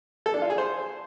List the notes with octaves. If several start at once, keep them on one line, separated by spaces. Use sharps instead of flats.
A4
D4
F4
G#4
C5